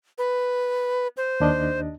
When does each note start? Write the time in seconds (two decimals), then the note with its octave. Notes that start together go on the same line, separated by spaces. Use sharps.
0.18 B4
1.17 C5
1.40 D#2 D4 D#5